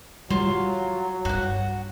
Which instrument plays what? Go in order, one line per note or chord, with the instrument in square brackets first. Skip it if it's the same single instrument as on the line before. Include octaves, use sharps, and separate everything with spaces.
[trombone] F#3 [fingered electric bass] G3 [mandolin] F4
[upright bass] G2 [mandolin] F#4 F#5